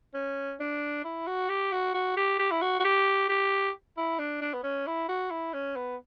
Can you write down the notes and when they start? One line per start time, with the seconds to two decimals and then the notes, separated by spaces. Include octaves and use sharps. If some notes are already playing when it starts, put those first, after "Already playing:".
0.14 C#4
0.60 D4
1.04 E4
1.27 F#4
1.49 G4
1.72 F#4
1.95 F#4
2.17 G4
2.39 G4
2.51 E4
2.61 F#4
2.80 F#4
2.84 G4
3.29 G4
3.97 E4
4.19 D4
4.42 D4
4.53 B3
4.63 C#4
4.87 E4
5.09 F#4
5.31 E4
5.54 C#4
5.76 B3